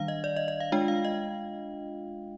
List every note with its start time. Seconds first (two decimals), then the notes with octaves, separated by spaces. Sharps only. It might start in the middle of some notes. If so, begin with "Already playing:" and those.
Already playing: D#3 G3 D4 F5
0.08 D#5
0.24 D5
0.36 D#5
0.48 D#5
0.60 F5
0.72 G#3 D4 F4 G5
0.88 F5
1.05 D#5